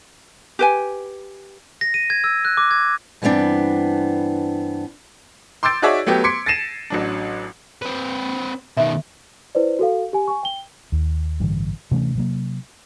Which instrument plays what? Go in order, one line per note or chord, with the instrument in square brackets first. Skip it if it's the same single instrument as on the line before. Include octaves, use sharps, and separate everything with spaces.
[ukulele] G4 B4 G#5
[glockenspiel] A#6
D#7
G#6
E6
F#6
D6
G#6
[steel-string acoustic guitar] G2 E3 B3 C4 D4
[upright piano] C6 D6 E6 G6 A6 D7
D#4 F#4 G#4 C#5 D5 E5
F#3 A3 B3 G4
C6 D6 G#6 B6 C#7 D7
A6 A#6 C7 D#7 E7
A1 F#3 D4
[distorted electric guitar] C4 B4
[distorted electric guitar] B2 D#3 [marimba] E5
[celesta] E4 B4 C5 D5
F#4 A4 F5
G4 G#5
G#5 C#6
G5 G7
[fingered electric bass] D#2
A1 G2 D3 E3
C3 E3 A3 C#4
C3 F#3 A#3